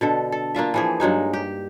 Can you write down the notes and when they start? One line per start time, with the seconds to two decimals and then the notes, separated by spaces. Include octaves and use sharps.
0.01 B2 D3 A4
0.32 A4
0.55 A#3 D4 F4 E5
0.74 E3 F3 G#4
1.00 G2 F#3 G#3 D#4
1.33 G4